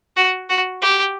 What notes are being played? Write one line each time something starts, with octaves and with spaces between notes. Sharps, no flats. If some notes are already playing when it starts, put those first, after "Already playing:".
F#4
F#4
G4